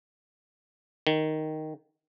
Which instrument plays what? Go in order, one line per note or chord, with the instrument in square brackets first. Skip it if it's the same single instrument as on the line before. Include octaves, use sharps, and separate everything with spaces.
[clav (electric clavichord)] D#3